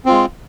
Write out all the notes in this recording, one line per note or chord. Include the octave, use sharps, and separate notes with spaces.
G#3 C4 F4